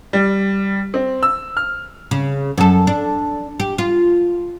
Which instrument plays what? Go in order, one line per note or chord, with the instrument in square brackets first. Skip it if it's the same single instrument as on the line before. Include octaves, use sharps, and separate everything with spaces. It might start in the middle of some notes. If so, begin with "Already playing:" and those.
[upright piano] G3
C4
E6
F6
[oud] C#3
F#2 A4
D4
G4
F4